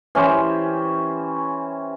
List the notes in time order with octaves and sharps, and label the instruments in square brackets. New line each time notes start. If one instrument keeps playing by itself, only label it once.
[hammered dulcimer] E3 C#4 G4 C5